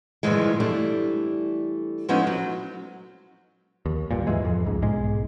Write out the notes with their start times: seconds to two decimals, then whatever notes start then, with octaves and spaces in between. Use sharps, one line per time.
0.23 G2 A#2 D3 E3 F3 G#3
0.60 E3 G3 A3 D4
2.09 F3 G#3 B3 C#4 D#4 E4
2.27 F#3
3.86 D#2
4.11 G1 G2 A#2
4.27 D#2 G#2 E3 G#3
4.45 F2
4.66 C#2 G#2
4.82 B1 G#2 G#3